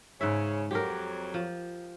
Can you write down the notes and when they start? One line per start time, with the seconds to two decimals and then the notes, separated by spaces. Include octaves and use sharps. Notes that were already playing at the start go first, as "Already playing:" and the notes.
0.21 G#2 C#3 C#5 E5
0.71 F2 F#3 G4 A#4
1.34 F3